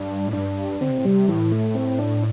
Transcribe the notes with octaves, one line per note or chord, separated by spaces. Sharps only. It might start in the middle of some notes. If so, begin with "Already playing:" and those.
Already playing: G2 D4
A2
G2 D4
D3 C4
C3
A2
C3 G3
A2 E3
A3
C4
D4